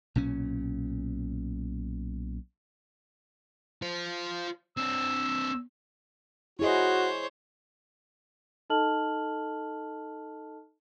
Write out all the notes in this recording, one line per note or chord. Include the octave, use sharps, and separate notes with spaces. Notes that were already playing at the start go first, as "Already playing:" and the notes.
B1 A#2 C#4
F4 C5
C4 D4 E6
E4 F#4 G#4 C5 C#5 D#5
D#4 A4 D#5 A5 F6 F#7